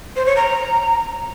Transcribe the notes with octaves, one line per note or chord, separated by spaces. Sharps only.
C5
C#5
A#5